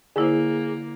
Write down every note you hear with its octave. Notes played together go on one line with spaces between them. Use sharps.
D3 A#3 E4 G#4 C5